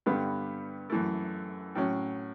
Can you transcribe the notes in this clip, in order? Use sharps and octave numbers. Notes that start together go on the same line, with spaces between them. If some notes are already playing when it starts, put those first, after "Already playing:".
G2 D3 G3 B3
F#2 E3 A3
A2 F#3 C#4